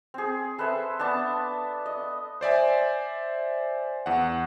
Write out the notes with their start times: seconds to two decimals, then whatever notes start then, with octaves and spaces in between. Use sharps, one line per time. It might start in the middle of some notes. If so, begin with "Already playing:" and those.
0.14 C4 G#4
0.58 A4 B4 C5 E5
0.99 B3 D4 A5
1.86 D#5
2.41 C5 D5 E5 G#5
4.06 E2 F#5